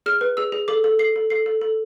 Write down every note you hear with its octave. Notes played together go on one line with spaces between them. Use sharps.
G#4 F6
B4
G#4 E6
G#4
A4 D6
A4
A4 C7
A4
A4 C7
A4
A4